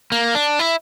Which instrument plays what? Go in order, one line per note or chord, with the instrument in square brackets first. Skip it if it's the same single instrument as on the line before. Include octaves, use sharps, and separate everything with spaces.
[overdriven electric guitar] A#3
D4
E4